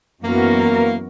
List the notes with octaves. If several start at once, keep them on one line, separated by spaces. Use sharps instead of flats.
F#2 E3 A#3 B3 F#4 A#4